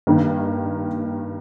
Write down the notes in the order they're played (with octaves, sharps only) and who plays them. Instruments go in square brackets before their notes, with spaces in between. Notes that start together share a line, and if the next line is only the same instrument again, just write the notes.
[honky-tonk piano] G2 D#3 A#3